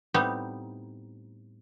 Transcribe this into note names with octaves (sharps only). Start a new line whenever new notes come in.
A2 G3 B3 C4 D#4